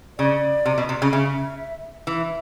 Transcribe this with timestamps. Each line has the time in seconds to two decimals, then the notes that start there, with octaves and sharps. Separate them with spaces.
0.18 C#3 D5
0.66 C3
0.78 B2
0.89 C3
1.02 C#3
1.13 C#3 E5
2.07 E3 E5